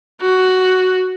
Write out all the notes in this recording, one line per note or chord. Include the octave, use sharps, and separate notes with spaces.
F#4